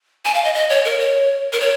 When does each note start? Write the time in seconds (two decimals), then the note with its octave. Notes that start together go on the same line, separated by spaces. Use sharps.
0.25 G#5
0.34 F5
0.44 D#5
0.54 D#5
0.70 C#5
0.85 A#4
1.00 C#5
1.53 A#4
1.60 C#5